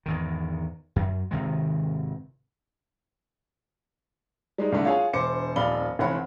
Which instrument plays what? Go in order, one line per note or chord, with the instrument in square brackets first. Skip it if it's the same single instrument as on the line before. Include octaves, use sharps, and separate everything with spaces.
[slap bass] E2 G#2 D#3
F#2
G#1 C3 D#3 G#3
[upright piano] G3 G#3 D#4
C2 D3 A3
F4 G#4 C#5 F#5 G#5
E1 C5 D6 C#7
D#1 F2 D5 F5 B5 G7
F1 E3 C4 C#5 F#5 B5